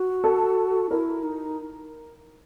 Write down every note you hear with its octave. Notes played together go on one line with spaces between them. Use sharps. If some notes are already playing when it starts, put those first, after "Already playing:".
Already playing: F#4
A4
E4 A#4
D#4